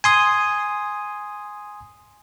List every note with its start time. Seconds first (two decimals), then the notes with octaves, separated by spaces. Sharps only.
0.04 G#5 C6 D#6